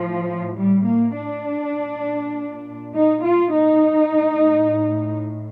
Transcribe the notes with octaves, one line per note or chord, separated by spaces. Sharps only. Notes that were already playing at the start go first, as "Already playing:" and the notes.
Already playing: A2 F3
G3
A#3
D4
A#2
D#4
F4
D#4
A2